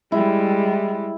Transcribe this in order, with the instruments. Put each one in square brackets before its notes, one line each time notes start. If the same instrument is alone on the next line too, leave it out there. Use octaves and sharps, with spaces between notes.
[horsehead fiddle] G3 G#3 [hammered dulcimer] E4